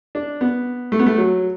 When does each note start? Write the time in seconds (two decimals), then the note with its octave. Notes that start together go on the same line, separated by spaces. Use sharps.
0.15 D4
0.41 B3
0.92 A3
0.99 B3
1.07 A3
1.18 F#3